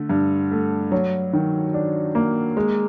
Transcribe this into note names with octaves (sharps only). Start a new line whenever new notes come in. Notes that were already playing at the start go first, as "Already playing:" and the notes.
Already playing: D3 A3
G2
A3
F#3
D#3
D4
A#3
G#3